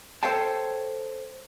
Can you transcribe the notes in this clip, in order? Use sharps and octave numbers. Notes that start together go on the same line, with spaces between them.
A4 C5 C#5 F5 G5 A5